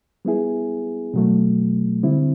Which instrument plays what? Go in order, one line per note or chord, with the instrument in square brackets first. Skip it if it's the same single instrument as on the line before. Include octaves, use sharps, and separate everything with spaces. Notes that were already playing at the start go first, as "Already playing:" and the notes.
[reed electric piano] G3 B3 E4 G#4
B2 F#3 A3
D3 G3 C4 E4